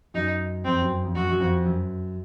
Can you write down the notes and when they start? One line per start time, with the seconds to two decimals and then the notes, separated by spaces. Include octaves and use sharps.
0.14 F#2 D#4
0.64 F2 C4
0.81 F#2
1.04 F2
1.15 F#2 F#4
1.29 F#2
1.40 F2
1.65 F#2